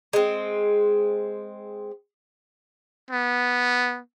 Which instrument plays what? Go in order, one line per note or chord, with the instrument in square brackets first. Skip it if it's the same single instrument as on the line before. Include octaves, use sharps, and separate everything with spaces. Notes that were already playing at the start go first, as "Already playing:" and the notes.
[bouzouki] G#3 C4
[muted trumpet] B3